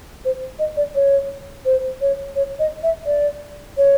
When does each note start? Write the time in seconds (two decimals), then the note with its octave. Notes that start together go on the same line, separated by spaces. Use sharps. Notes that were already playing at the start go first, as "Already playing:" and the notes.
0.25 C5
0.59 D#5
0.77 D5
0.95 C#5
1.65 C5
2.01 C#5
2.36 C#5
2.59 D#5
2.83 E5
3.06 D5
3.77 C#5